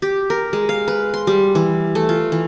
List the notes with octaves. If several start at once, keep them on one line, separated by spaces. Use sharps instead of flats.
G4
A#4
G#3
F5
B4
C6
G3
E3
A3
F4
E3